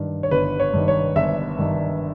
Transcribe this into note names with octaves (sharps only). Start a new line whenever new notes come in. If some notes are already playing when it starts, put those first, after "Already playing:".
Already playing: G2 D#3
C#5
G1 B4
C#5
G2 D#3
C#5
G1 E5
G2 D#3